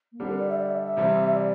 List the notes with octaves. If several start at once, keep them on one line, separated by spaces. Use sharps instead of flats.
A#3
D3 G3 C4 D4 G4
A#4
D5
E5
D5
E5
E5
C3 E3 G3 C4
E5
D5